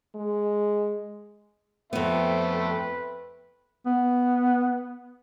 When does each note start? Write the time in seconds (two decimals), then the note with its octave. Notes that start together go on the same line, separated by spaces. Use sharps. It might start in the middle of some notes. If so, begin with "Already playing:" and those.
0.15 G#3
1.93 F2 A3 B3 C4 B4 E5
3.86 B3